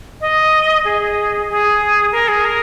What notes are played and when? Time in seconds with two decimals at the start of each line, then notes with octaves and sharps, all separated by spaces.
0.21 D#5
0.85 G#4
1.49 G#4
2.12 A#4
2.28 G#4
2.45 A#4